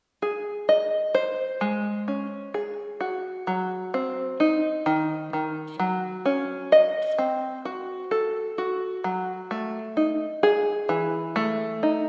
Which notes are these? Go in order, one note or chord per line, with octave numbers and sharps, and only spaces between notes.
G#4
D#5
C5
G#3
C#4
G#4
F#4
F#3
C4
D#4
D#3
D#3
F#3
C#4
D#5
C4
F#4
A4
F#4
F#3
A3
D#4
G#4
E3
A3
D#4